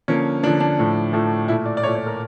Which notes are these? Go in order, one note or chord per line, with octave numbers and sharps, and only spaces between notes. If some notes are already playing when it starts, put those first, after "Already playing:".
D3 F3 A#3 C#4
D3 F3 A#3 D4
D4
A2 F3 A3
A2 F3 A3
A#2 A3 E4
D5
D5
A#2 A3 C#5
C#5
A#4